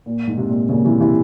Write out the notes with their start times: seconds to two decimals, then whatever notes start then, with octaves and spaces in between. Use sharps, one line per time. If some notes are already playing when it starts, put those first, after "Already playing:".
0.06 A#2
0.27 G#2
0.38 C3
0.48 A#2
0.69 A#2 C#3
0.85 C3 E3
1.00 C3 E3